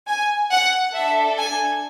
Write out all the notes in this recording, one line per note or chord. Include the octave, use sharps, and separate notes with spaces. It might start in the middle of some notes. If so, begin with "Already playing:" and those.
G#5
F#5
D4 A4 E5
G#5